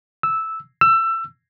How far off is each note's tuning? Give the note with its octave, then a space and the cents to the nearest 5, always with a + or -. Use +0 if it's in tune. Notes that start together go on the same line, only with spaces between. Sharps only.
E6 -10
E6 +20